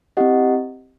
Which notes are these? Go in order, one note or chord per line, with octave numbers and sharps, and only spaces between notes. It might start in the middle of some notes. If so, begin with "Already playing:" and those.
C4 E4 G4 D#5 F#5